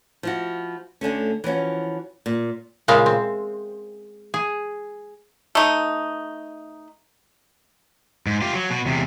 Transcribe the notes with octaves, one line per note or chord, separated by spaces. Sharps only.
F3 E4 F#4
D2 D3 A3 C#4
E3 F3 C#4 F#4
A#2
A#2 C#3 G#3 C5 E5 F5
C4
G#4
A3 D#4
G#2
F4 G4
F#3
B2 F#4
E2 C3